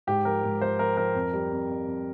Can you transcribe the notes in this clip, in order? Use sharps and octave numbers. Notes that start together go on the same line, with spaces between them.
G#2 G4
F3 A#4
G#2
F3 C5
F3 A#4
F3 A#4
F2
G3
F2
F2
F2